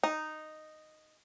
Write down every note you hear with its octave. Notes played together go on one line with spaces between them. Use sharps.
D#4